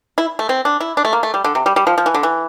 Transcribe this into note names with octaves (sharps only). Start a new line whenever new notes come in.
E4
A3
C4
D4
E4
D4
A3
A#3
A3
G3
D3
C3
G3
G3
F3
F3
E3
D3
E3